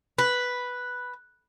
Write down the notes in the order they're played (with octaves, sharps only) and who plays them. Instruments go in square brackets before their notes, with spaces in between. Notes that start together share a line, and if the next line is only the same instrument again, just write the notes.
[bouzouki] B4